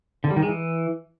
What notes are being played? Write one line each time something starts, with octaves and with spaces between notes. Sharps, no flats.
D3
G3
D#3
G#3
E3